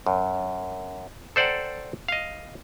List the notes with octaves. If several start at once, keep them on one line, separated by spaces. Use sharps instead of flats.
F#2
A4 C5 D5 F#5 G5 A#5
D#5 F5